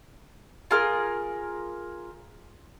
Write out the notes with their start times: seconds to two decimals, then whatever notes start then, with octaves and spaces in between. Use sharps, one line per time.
0.71 F4 G#4 A#4 F6